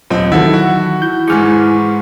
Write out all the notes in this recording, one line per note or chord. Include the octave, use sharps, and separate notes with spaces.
D#1 F#3 C4 F4 D#5
D#3 E3 F#3 E4 A4 F#5
F#4
E4 G6
G#2 E3 G#3 C#6 D6 F6